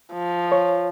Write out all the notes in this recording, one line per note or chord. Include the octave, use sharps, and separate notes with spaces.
F3
C#5